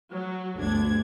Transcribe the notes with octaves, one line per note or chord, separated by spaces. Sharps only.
F#3
G1 D2 D4 G#6